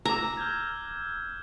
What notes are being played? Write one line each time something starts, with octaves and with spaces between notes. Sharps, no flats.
A#5 D6 E6
F6 G6 G#6